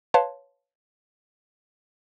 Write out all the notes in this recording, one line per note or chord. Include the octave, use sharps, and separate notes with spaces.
B4 C#5 F5 A5 C6